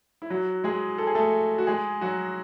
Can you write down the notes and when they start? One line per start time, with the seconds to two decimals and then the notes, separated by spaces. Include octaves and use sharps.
0.22 E4
0.30 F#3 F#4
0.64 G#3 G#4
0.98 A4
1.07 G#4
1.15 A3 A4
1.58 F#4
1.67 G#3 G#4
2.01 F#3 F#4